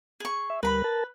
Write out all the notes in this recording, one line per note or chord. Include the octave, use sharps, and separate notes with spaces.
G#4 C#6
E5
D2 G3 A#4 B4 B5
A#4 A5